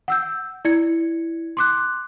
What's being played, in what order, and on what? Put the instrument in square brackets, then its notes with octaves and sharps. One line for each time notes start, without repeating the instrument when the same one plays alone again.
[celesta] F#5 E6 G6
E4 D5 G#6 C#7
C6 D6 F#6